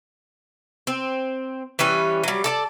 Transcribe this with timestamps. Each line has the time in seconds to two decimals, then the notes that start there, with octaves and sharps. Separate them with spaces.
0.87 C4
1.79 E3 G3 C#4 B4
2.24 F#3 G3
2.44 A4 D5 A5